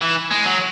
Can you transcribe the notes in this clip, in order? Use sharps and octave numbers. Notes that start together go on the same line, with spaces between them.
E3
G#3
F#3